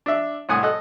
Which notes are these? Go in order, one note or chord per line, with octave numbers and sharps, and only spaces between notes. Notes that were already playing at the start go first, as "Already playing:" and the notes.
D4 E5
C2 A2 F#5 G#5 D#6
A4 D#5 F#6